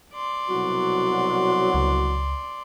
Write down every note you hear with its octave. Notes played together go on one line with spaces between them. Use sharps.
D5 C6
C2 B2 F#3 F#4
C#2